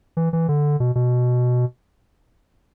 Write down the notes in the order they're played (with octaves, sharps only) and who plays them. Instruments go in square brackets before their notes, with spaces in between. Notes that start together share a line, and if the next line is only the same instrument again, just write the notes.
[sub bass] E3
E3
D3
B2
B2